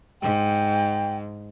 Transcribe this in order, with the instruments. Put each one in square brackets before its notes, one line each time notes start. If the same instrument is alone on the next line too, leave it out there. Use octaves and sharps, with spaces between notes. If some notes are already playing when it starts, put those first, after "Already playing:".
[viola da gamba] G#2 [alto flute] G5